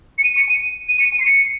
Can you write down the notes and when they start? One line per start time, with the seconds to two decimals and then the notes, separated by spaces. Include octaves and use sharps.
0.18 C#7
0.24 D#7
0.37 C#7
0.49 D#7
0.89 D#7
1.00 C#7
1.13 D#7
1.20 C7
1.26 C#7